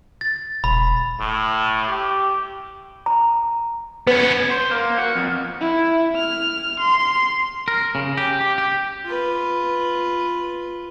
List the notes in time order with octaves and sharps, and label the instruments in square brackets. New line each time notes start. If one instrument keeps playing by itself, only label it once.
[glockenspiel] A6
[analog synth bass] E1 [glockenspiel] B5
[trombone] A2
G4
[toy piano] A#5
[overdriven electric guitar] B3 C#4 [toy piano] B4
[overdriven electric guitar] C5
A#3
F#4
F2
[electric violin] E4
F6
C6
[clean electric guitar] A#4
C#3
G4
G4
G4
[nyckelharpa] F4 B4